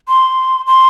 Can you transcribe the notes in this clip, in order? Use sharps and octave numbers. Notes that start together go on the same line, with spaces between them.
C6
C6